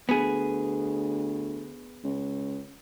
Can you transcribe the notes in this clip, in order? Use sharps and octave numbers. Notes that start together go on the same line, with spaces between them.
D2 B3 G#4
C#2